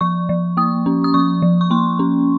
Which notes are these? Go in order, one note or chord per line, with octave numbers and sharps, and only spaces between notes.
F3 C#6
F3
A#3 D#6
C#4
D#6
F3 C#6
F3
C#6
A#3 C6
C#4